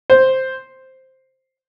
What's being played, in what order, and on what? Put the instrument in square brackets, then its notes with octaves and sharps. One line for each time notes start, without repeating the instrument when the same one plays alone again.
[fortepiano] C5